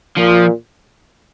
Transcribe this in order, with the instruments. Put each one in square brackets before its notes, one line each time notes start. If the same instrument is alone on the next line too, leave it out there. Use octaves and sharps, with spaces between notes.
[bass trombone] A#2 [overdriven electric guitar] F3